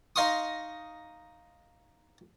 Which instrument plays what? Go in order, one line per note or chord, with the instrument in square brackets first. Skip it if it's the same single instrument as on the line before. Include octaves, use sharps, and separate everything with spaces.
[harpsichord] D#4 D#5 F5 C6 C#6 D#6